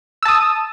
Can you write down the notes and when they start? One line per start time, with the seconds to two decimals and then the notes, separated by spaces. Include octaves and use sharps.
0.23 E6
0.25 A5
0.28 D#6